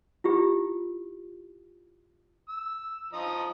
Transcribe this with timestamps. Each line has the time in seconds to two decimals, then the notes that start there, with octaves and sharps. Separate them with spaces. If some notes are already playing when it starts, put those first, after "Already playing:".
0.24 E4 F4 G4
2.49 E6
3.13 F3 D#5 A#5